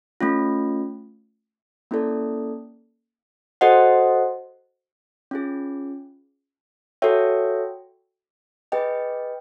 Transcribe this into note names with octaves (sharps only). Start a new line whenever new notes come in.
A3 C#4 F4
A#3 C#4 E4 A4 D5
F#4 A4 C5 D#5 F#5
C#4 F4 G#4
F#4 A4 C#5 E5 G5
G#4 B4 D#5 G5